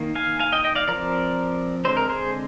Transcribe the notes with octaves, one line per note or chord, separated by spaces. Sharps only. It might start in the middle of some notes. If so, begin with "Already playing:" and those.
Already playing: D#3 A#3
F5 G#5
F5 G#5
D#5 G5
D#5 G5
D5 F5
F3 C4 A#4 D5
D3 G#3 C4 C5
A#4
G#4 C5